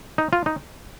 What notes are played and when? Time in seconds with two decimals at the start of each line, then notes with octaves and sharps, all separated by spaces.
0.18 D#4
0.33 F4
0.46 D#4